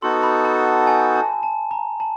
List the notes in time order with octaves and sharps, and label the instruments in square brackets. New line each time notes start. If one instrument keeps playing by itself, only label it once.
[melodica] B3 D#4 F#4 A4 [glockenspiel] C6
[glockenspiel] B5
A5
A5
G#5
A5
A5
A#5
A5